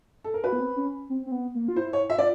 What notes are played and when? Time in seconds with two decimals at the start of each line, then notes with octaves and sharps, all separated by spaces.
0.24 A4
0.34 A#4
0.44 F#4 B4
0.53 B3
0.60 C4
0.76 C#4
1.10 C4
1.26 C4
1.31 B3
1.55 A#3
1.68 F4
1.76 E4 C5
1.93 C#5
2.10 F4 E5
2.19 D5